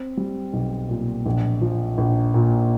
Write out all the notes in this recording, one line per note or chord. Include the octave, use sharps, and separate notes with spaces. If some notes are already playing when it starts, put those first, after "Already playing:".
Already playing: C4
G3
B1
A#2
A#1
F3
A#1
A#2